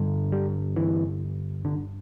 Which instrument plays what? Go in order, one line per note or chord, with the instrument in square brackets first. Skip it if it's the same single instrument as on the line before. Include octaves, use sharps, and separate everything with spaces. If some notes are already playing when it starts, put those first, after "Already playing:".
Already playing: [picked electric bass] G2 D3
G3
E3
D3